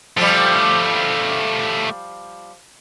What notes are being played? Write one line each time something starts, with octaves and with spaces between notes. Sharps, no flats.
F3 G3 A3 G4